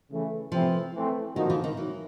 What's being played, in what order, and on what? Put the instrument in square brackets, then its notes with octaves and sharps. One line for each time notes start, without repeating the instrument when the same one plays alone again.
[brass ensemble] C#3 E3 A3
[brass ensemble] C3 E3 A3 C4 E4 [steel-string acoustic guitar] F3
[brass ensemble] E3 A3 C4
[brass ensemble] D3 F3 A#3 D#4 F#4 [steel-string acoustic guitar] D#3
[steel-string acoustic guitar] E3
D#3
[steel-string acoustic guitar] E3 [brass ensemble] F#3